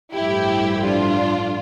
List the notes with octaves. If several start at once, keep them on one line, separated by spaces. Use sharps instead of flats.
A1 G2 F3 A3 E4 G4
D4 F4